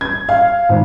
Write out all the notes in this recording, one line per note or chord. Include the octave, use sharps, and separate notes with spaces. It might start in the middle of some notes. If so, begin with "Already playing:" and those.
G#6
F5
G#1